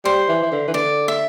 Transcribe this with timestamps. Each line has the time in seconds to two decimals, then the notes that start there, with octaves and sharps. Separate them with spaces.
0.05 G3 C5
0.29 E3
0.43 E3
0.52 D3
0.68 E3
0.74 D3 D5
1.08 E5